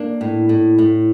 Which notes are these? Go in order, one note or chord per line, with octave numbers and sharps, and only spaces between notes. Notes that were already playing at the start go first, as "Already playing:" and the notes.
Already playing: A#3 D4
A2
A2
A2